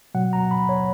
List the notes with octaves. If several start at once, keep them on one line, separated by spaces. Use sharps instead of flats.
B2 F#3 F#5
A#5
B5
C#5